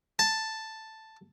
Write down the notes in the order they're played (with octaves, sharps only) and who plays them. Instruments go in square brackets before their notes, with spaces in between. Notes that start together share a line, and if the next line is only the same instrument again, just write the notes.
[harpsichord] A5